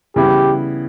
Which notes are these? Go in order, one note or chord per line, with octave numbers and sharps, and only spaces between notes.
C#3 E3 G3 B3 E4 G4